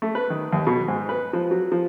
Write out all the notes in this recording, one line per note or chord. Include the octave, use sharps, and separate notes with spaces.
A3
B4
D#3
D#2
B2
G#2
B4
F3
F#3
F3